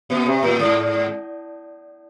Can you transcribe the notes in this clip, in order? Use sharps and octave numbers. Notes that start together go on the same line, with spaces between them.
A#2
C3
A2
G#2